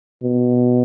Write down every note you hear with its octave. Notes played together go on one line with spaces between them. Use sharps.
B2